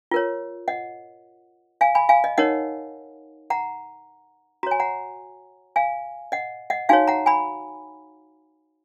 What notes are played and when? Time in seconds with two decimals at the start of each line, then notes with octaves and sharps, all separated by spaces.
0.11 F4 A#4 C#5
0.68 D#5 F#5
1.81 F5 G#5
1.95 G#5 B5
2.09 F5 G#5
2.24 D#5
2.38 D#4 A#4 C#5 D#5 F#5
3.50 F#5 A#5
4.63 F#4 A#5
4.67 C#5 G#5
4.80 F#5 A#5
5.76 F5 G#5
6.32 D#5 F#5
6.70 D#5 F#5
6.89 D#4 F#4 C#5 F5 G#5
7.08 F#5 A#5
7.26 G#5 B5